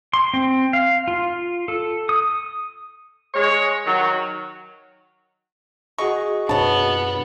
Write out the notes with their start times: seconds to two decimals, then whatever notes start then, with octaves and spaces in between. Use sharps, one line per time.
0.13 C6
0.34 C4
0.73 F5
1.08 F4
1.68 A4
2.09 D#6
3.34 G#3 C#5
3.86 D#3 F#3
5.98 F#4 G#4 D#5 C#6
6.49 F#2 B2 B3 D4 C#5 A5